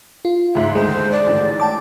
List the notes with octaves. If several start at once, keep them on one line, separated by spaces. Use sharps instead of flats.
F4
C#2 G#2 E5
D#2 G#2 D3 G#3 C5
D5
A1 G#2 D3
G5 A5 D6